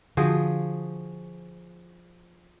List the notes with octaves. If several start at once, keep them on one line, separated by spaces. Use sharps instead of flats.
D3 F3 F#4 G#4